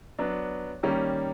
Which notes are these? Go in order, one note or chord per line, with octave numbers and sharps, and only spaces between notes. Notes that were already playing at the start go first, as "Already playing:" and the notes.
F#3 B3 D4
D#3 G3 A#3 C#4